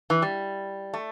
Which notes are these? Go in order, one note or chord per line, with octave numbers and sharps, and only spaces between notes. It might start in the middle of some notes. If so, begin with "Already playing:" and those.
E3
G3
A3